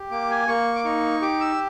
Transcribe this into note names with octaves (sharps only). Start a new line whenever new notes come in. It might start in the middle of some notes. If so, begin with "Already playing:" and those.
Already playing: G4
A#3 D6
G#5
A#3 C#6
D6
D#4 C#6
G4 D6
E6